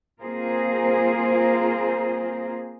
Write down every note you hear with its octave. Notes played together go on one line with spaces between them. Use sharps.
A#3 C4 F4 G#4 A#4 C5